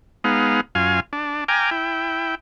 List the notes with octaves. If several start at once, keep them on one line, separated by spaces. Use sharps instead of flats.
G#3 B3 D#4 F5
F#2 F4 F5 G#5
D4
G5 G#5 A#5 D6 F6
E4 G5